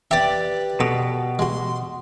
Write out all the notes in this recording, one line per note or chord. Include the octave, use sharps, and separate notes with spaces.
G4 B4 D5 E5 G5
B2 A4
G#3 F#4 C6